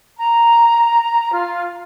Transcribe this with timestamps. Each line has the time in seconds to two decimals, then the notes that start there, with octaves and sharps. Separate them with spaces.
0.17 A#5
1.32 F4